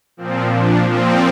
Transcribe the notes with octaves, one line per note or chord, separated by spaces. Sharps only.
A#2 F3 C4
D4
A#2 F3 C4